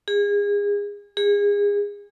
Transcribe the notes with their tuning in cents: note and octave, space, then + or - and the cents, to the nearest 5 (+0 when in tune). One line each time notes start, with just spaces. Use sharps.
G#4 -30
G#4 -30